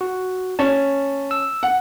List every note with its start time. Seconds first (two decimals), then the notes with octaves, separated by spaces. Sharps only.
0.01 F#4
0.59 C#4 A5 C#6
1.31 E6
1.63 F#5